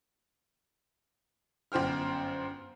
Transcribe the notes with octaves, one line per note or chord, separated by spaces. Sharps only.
G1 F#2 C5 G5 F6